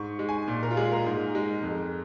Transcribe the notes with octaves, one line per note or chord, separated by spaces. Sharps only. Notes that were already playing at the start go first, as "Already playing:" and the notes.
Already playing: G#2 C#6
G#3
G#5
A#2
A#4
F4
G#3 G#4
A#4
G#2
G#3
F2